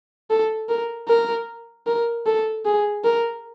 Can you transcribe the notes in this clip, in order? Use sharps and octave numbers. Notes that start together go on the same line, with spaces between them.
A4
A#4
A#4
A#4
A4
G#4
A#4